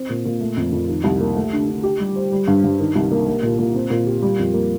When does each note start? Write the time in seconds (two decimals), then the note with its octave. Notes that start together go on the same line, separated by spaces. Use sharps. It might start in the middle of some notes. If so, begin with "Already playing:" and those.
Already playing: C4
0.10 A#2
0.25 A#2
0.41 A3
0.57 F2
0.72 F2
0.88 D#3
1.04 C2
1.20 A#3
1.36 A3
1.53 D3
1.69 D3
1.83 G4
2.00 G3
2.16 C5
2.32 G3
2.47 G2
2.64 G2
2.79 D#3
2.95 C2
3.12 A#3
3.27 A#3
3.43 A#2
3.59 A#2
3.75 C4
3.90 A#2
4.07 G4
4.22 G3
4.39 F2
4.54 A#3